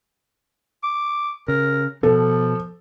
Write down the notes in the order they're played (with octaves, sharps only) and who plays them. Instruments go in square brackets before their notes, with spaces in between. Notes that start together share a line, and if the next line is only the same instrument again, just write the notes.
[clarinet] D6
[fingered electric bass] C#3 [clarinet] A#4
[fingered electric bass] B2 [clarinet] F3 [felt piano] A4